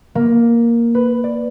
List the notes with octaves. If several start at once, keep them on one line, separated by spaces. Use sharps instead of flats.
A#3
B4
D5